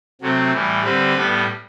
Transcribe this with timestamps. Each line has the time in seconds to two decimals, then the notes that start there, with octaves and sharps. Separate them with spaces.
0.21 C3 F#3 A3 C4
0.53 A2 E3 G3
0.84 D3 G3 C4 B4
1.15 A2 G3 B3